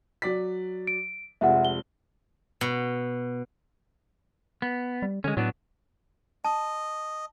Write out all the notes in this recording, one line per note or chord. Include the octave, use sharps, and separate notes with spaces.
F#3 D5 B6
D7
F1 F3 G#3 E5 F#5
G7
B2
B3
G3
D3 G#3 C#4
A2 F#3 B3 D4
D#5 A5